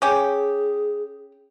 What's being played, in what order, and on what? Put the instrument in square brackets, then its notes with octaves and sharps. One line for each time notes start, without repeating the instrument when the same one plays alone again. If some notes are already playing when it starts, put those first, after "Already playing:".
[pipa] C#4 G4 [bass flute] G#4